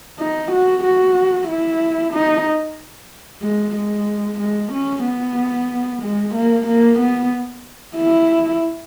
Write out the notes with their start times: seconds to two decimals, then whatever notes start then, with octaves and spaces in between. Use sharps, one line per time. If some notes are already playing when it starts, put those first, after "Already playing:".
0.19 D#4
0.52 F#4
0.84 F#4
1.48 E4
2.14 D#4
3.42 G#3
3.76 G#3
4.40 G#3
4.72 C#4
5.05 B3
6.03 G#3
6.35 A#3
6.67 A#3
6.99 B3
7.96 E4